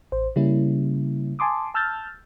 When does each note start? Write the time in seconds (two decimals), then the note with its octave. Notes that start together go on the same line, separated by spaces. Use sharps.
0.12 A1 C5
0.36 C#3 G3 A#3 C#4 E4
1.39 G#5 A5 C6 D6 D#6
1.74 A5 E6 F6 G6 A6